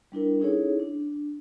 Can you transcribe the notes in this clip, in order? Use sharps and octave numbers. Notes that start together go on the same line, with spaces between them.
G3 D4 E4 A#4
C#4 D#4 E4 G#4 A4 C#5
D4